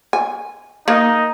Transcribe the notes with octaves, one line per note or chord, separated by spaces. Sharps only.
G#5
A#3 D#4